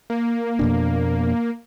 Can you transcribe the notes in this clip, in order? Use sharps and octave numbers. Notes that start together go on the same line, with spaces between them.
A#3
F2 B2 D4